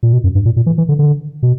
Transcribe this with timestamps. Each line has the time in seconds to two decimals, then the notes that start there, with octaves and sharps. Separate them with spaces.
0.03 A#2
0.13 B2
0.24 F#2
0.35 G2
0.45 A#2
0.56 A#2
0.66 E3
0.78 E3
0.89 D3
0.99 D3
1.43 B2